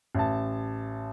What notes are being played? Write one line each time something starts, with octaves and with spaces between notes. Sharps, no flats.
A1 A5